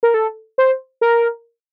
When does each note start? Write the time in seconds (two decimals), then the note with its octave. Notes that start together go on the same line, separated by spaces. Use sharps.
0.03 A#4
0.14 A4
0.58 C5
1.01 A#4